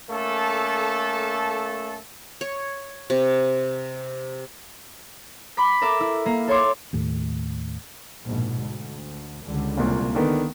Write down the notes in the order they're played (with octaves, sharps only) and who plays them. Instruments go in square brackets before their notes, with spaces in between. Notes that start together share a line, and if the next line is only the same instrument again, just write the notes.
[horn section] A3 A#3 C#4 A4
[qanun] C#5
C3
[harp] B5 D6 B6
A4 A#4 E5 D6
E4
A#3
A4 C#5 C6 D6
[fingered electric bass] D#2 A2
[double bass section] A#1 G#2 B2
D2
C#2 D3 G3
[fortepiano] C2 A#2 [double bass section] A#3
[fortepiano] D3 D#3 B3